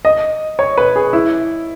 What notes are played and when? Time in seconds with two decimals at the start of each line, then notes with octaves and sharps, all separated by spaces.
0.05 D#5
0.59 C#5
0.78 B4
0.96 G#4
1.13 E4